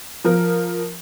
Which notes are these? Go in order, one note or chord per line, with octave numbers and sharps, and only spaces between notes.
F3 A#4